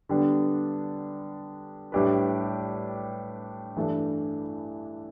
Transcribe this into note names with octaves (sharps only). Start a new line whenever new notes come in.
D3 G3 B3 D4
A2 G3 D4 G4 B4
G2 E3 A3 D4